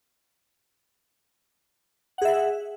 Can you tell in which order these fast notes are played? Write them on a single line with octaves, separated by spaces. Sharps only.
F#5 G#4 E5